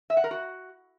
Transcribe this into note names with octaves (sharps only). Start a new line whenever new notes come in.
E5
F#5
A#4
F#4